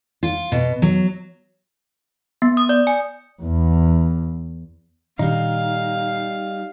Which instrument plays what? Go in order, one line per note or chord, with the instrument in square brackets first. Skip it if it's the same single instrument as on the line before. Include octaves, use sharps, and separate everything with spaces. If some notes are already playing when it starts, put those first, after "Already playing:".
[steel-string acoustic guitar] F4
B2
F#3
[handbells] B3
D#6
D5
G#5
[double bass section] E2
[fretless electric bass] A#2 D#3 D4 [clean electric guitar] G3 D#4 [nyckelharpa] F5